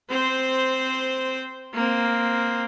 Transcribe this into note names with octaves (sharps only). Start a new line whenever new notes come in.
C4 C5
A#3 C4